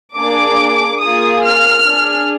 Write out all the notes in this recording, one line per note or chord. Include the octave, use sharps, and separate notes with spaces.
A#3 D4 G#4 D6
A#3 F4 G#4 D#6
F6
D4 G#4